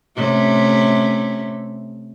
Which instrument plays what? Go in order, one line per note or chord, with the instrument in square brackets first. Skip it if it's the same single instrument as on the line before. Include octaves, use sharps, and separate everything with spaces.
[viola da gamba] C3 A3 C#4